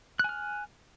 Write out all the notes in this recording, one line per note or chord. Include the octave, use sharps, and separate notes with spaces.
G#5 F6 F#6